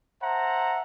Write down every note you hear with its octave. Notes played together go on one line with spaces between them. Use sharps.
C5 E5 F#5 A5 A#5